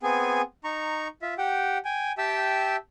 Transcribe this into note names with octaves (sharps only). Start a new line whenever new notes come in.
B3 C4 G#4 G#5
D#4 A#5 C#6
F4 E5
G4 F#5 G5
G5 G#5
G4 E5 G5 A5 E6